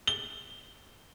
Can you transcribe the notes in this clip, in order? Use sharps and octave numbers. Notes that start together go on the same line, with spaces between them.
G7